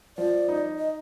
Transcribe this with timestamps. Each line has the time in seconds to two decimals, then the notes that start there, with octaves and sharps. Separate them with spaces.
0.17 F3 D5
0.48 D#4
0.78 D#5